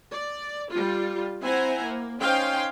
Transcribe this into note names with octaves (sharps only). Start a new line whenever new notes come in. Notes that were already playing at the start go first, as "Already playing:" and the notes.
D5
G3 F4
C4 E4 C5 F#5 G#5 A#5
A#3
C#4 D#4 C5 F5 G5 C6